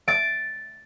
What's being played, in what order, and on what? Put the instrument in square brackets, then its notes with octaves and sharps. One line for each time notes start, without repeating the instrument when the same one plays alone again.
[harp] A6 D7